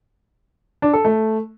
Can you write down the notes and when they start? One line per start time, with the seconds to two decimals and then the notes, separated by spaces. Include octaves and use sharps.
0.82 D4
0.93 A4
1.05 A3